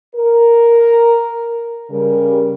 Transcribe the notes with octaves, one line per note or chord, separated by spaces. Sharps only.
A#4
C#3 G3 A#4